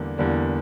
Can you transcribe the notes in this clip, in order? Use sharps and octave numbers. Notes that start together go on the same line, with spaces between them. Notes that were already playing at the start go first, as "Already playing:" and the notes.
Already playing: E2 D3 G3 A#3
E2 D3 G3 A#3